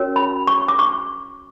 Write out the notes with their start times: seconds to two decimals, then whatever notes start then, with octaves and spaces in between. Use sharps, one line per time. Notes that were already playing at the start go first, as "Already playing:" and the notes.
Already playing: C#4 F#4 A#4 C#5
0.16 B5
0.47 C#6
0.68 D6
0.79 C#6